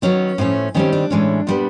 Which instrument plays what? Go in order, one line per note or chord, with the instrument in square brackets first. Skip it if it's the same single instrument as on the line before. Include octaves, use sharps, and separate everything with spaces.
[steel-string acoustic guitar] D#3 F#3 B3 C#4
A2 F3 A3 C#4
D#3 G3 C4 C#4
D4
A2 E3 G#3 C#4
A#2 G3 B3